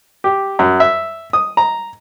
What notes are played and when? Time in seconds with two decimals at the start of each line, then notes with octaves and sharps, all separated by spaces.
0.24 G4
0.59 F#2
0.80 E5
1.33 D#6
1.57 A#5